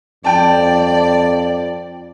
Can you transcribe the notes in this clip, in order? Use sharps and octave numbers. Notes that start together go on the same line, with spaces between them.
F2 D5 G5 A5